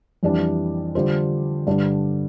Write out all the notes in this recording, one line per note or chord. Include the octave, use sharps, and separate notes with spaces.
F2 E3 G3 D4
D3 G3 D4 F4 C5
G2 D3 G3 D4